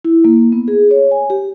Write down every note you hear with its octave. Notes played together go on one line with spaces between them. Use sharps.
E4
A#3
B3
G#4
C#5
G#5
G4